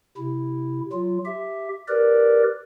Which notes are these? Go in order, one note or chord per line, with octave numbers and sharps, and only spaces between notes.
C3 E4
F#3 F4
G4 E5
G4 A#4 B4 D5